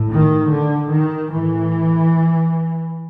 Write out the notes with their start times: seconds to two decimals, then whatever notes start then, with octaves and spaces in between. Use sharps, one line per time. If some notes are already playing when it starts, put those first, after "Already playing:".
Already playing: A2
0.10 D#3
0.50 D3
0.91 D#3
1.31 A2 E3